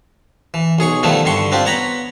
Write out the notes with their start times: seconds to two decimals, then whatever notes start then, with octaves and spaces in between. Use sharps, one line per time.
0.54 E3
0.79 B1 G#4 C#5 C#6
1.03 D#3 F3 G3 A3 B3 E4
1.25 G2 D3 G3 C6 C#6
1.52 C4 D4 F4 G4
1.65 B3 C#5 A#5 B5